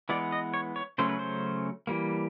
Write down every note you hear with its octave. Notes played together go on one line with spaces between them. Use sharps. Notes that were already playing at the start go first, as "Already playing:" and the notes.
E3 G#3 B3 D5
D#5
C#5
C#5
C#3 F#3 A3 C#4 C5
B4
C5
E3 G3 A#3